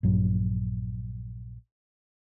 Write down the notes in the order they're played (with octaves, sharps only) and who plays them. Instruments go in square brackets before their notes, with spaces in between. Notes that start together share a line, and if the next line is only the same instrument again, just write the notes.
[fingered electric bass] A#1 G2 F#3